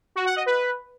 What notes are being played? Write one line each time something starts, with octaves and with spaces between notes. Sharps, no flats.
F#4
F#5
D#5
B4